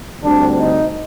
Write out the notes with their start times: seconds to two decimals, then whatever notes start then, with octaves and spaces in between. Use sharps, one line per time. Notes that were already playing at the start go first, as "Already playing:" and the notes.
0.22 D2 D3 G3 C4 D4
0.58 D#4